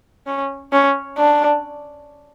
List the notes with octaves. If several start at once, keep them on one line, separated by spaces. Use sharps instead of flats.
C#4
C#4
D4